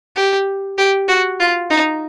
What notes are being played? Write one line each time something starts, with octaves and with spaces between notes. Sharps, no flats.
G4
G4
F#4
F4
D#4